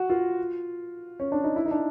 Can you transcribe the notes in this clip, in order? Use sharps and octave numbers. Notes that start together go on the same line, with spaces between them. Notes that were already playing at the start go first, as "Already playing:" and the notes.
Already playing: F#4
F4
C#4
D4
D#4
E4
D#4
D4